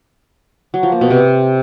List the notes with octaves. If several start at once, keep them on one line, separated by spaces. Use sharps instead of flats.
F#3
F3
A#3
B2
C3